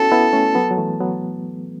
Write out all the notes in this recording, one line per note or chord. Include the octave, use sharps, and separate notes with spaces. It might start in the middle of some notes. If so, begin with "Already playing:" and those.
Already playing: B3 C#4 E4 F#4 A4
B3 E4
A3 C#4
F#3 B3
F#3
E3 A3
F#3 B3